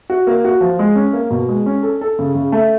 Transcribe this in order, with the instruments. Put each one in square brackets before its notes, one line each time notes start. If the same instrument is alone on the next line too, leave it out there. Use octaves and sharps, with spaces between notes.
[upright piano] F#4
A#3
F#4
F3
G#3
C#4
A#3
B2
G#3
C#4
A4
A4
C#3
C#3
A3